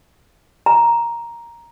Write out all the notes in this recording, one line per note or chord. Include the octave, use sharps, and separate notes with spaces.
A#5